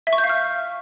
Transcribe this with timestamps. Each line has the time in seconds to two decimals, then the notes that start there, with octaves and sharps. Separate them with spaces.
0.07 E5
0.13 C#6
0.18 G6
0.24 F5
0.29 F6